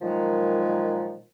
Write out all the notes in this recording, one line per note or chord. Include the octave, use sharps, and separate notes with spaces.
A#2 D#3 F3 F#3 G#3